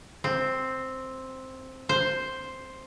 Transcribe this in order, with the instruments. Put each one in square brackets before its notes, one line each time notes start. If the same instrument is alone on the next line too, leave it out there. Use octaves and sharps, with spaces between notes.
[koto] C4
C5